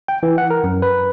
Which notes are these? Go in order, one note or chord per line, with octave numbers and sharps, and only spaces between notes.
G5
E3
F#5
A#4
F#2
B4